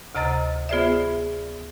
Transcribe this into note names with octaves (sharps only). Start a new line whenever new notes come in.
D2 C3 D#5 A#5 A6
B3 F4 G#4 C5 D5 E5